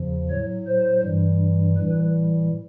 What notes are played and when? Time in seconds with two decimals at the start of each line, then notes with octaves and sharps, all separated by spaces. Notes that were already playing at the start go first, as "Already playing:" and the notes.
Already playing: E2 C#3 F3
0.30 A2 F#3 C#5
0.67 C5
1.04 G2 E3 G3
1.77 A2 E3 G3 B4